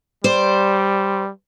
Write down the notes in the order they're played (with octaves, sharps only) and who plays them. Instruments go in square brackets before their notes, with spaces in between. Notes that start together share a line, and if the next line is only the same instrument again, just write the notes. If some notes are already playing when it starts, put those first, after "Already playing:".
[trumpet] G3 [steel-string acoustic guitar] C5 D5